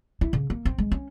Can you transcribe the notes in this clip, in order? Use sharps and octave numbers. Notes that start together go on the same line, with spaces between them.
E4
C#3
A#3
C4
G#3
C#4